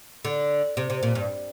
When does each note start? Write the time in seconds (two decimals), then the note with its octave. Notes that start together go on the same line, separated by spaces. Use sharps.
0.25 D3
0.77 C3
0.90 C3
1.03 A#2
1.15 G2